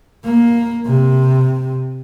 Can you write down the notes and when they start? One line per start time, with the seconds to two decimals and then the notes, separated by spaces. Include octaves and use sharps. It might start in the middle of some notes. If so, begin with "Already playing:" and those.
0.24 A#3
0.85 C3